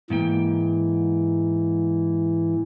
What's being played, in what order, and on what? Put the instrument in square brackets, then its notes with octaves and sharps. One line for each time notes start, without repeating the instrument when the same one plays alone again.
[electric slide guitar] G#2 A#3 G5 [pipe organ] E3